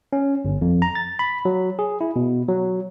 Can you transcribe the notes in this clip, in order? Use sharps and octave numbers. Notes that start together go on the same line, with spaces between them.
C#4
G1
F2
A#5
A6
B5
F#3
G#4
E4
B2
F#3